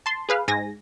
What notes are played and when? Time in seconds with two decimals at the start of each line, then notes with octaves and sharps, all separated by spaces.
0.06 A5 C6
0.29 G#4 B4 F5
0.48 G#2 G#5 A#6